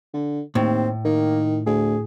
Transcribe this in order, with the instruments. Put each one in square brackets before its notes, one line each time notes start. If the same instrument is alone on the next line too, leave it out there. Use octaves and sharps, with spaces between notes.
[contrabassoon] D3
[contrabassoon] D#2 [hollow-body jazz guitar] A2 [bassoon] C4
[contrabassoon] D#3 [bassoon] A#3
[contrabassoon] D2 [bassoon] G#4